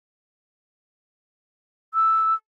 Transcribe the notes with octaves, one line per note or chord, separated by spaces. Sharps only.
E6